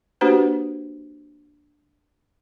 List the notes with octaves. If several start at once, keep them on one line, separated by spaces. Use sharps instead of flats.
A#3 D4 F#4 G4 B4 C5